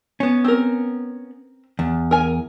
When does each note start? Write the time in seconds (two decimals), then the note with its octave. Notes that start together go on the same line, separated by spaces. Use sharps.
0.20 B3 C#4
0.45 C4 A#4
1.79 E2
2.11 A#4 G#5